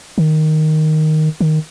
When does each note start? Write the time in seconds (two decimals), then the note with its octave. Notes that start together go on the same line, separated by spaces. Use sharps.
0.18 D#3
1.41 D#3